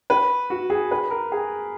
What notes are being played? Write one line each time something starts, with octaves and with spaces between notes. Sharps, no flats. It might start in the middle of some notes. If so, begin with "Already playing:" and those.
B4
F#4
G#4
B4
A#4
G#4